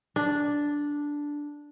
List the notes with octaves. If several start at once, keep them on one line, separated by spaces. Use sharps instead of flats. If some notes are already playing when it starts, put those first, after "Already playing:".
D4